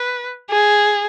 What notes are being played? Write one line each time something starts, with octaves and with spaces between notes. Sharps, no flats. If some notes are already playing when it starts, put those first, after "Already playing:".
Already playing: B4
G#4